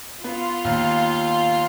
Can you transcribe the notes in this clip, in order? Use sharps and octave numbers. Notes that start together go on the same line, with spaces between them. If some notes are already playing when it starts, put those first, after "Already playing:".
B3 F4
D#2